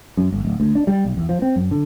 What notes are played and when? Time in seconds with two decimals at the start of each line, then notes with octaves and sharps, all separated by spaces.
0.17 F#2
0.32 G1
0.45 D1
0.60 D2
0.75 D4
0.87 G3
1.05 B1
1.17 E2
1.29 F3
1.42 C4
1.56 F#2
1.71 D3